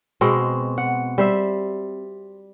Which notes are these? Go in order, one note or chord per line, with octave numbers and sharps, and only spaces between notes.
B2 G#3 C4
F#5
G3 C5 E5